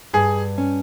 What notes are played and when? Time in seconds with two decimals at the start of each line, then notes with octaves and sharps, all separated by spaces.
0.13 G2 G#4
0.58 C#4